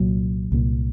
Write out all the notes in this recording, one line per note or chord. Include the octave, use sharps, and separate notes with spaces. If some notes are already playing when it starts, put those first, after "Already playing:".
Already playing: C2 A#2 F#3
C2 A#2